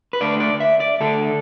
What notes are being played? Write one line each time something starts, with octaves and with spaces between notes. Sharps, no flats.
B4
D2 D3 A3 D4 D5
D5
E5
D5
D2 D3 A3 D4 A4